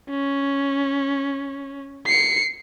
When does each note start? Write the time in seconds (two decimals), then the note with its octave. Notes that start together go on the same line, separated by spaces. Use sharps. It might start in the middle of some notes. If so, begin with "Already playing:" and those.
0.10 C#4
2.06 C7 C#7